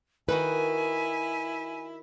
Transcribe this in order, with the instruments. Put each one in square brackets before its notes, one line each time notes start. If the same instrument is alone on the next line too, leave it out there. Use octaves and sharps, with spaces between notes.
[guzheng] D#3 D#4 F#4 [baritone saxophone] E4 [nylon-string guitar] B4 [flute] G#5